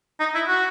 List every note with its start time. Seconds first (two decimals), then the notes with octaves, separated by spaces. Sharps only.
0.20 D#4
0.35 E4
0.48 F#4